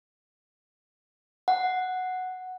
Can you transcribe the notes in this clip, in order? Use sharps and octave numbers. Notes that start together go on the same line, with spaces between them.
F#5